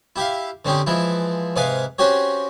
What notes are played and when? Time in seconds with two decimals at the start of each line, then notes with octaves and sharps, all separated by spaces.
0.16 E4 G4 E5 F5
0.65 D3 C4 C#4 D#4 G4
0.87 E3 F3 G#3 E4
1.56 G#2 C3 B4 F5 G#5 D#6
1.98 C4 C#4 F#4 G4 C#5